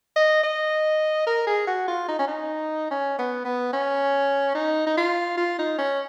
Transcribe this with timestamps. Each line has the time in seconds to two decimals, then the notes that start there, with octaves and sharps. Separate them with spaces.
0.16 D#5
0.43 D#5
1.27 A#4
1.47 G#4
1.67 F#4
1.88 F4
2.08 D#4
2.19 C#4
2.28 D#4
2.91 C#4
3.19 B3
3.45 B3
3.73 C#4
4.55 D#4
4.87 D#4
4.97 F4
5.37 F4
5.59 D#4
5.78 C#4